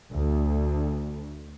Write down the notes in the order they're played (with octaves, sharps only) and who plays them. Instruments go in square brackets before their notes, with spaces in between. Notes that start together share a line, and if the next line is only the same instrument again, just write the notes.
[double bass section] D2